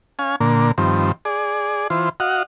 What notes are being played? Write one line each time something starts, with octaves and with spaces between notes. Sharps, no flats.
C#4 F5 G#5
A#2 D3 A#3
G2 D#3 F3 C4
G#4 D5
E3 F4 C5
F#4 D#5 F5 F#5